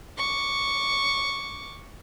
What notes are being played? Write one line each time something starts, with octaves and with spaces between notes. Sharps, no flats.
C#6 D6